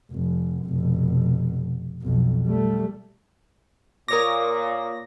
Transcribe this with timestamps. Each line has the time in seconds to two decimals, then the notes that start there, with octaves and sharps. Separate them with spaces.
0.12 F1
0.66 F1 B2
2.03 B1 F2
2.46 G3 A3
4.08 A#2 A#4 C#5 D6 D#6 A#6